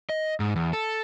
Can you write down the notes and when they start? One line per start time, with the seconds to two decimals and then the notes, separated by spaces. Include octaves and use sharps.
0.09 D#5
0.40 G#2
0.56 E2
0.73 A4